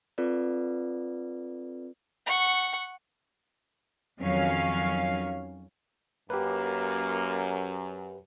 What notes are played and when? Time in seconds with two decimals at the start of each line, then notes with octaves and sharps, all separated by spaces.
0.18 C4 F4 A4 B4 D5
2.27 F#5 C#6
4.20 F2 D#3 F#3 C#4 C#5 F5
6.30 F#2 A#3 G4 B4